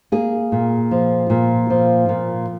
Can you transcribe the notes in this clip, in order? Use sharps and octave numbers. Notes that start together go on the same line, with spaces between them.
A#3 G#4
A#2
F3
A#2
F3
A#2